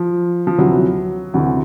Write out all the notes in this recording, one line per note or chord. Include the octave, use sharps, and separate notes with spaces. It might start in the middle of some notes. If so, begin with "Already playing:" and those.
Already playing: F3
F3
D2 C3 E3 F#3
D2 C3 E3